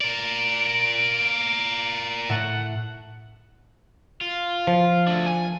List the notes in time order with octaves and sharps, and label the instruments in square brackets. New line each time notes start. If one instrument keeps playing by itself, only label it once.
[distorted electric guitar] A#4 D5 [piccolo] D7
[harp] A2 A3 A5 [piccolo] F#5
[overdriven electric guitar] F4
[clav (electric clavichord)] F3
[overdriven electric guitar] A3 D4
G#5